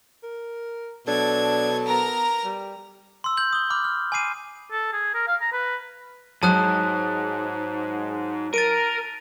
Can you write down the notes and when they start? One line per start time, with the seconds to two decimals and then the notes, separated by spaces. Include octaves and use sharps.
0.23 A#4
1.08 B2 F#3 D4 A4 G#6
1.86 B3 A#4 A#5
2.45 G3
3.24 C6 E6
3.37 G6 F#7
3.53 D#6 G7
3.70 B5 D6 F6
3.84 F6
4.12 G#5 B5 D6 C7 D#7
4.71 A4
4.93 G#4
5.14 A#4
5.27 F5
5.41 A#5
5.52 B4
6.43 G#2 F#3 A5 D#6 F#6
8.54 A#4 A6 D7 D#7